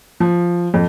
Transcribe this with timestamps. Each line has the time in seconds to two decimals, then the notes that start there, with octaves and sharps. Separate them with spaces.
0.20 F3
0.74 F2